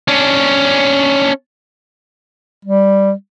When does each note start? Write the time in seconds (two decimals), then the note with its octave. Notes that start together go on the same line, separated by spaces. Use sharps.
0.08 C#4 D4
2.65 G3